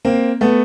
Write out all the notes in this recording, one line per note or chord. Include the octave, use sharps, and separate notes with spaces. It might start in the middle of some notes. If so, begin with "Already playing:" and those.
A#3 C4
A3 B3